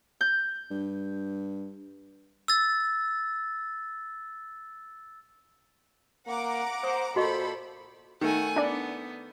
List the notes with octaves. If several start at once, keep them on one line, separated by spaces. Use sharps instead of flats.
G6
G2
E6 A6
A#3 F#5 A#5 D6
C5 D#6
A#2 F#4 A4 C5 D#5 B5 C#6
D#3 A3 F#5 G#5
B3 D4 D5